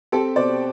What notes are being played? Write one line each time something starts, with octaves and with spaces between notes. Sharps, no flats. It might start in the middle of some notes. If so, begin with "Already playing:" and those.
C4 G4 A4
B2 C5 D5